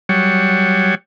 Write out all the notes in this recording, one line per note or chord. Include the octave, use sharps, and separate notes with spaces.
F#3 G3 C#5